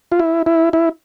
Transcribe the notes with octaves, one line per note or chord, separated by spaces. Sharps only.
F4
E4
E4
E4